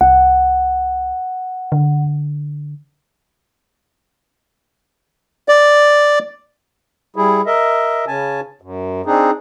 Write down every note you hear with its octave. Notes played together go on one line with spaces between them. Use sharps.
C2 F#5
D3
D5
G3 E4 G#4
A#4 D#5 E5
C#3 C#4 G#5 A5
F#2
C4 D4 D#4 G#4